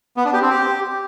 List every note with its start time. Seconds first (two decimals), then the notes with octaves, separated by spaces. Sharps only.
0.17 B3
0.25 D4
0.33 G4
0.42 C4
0.50 G4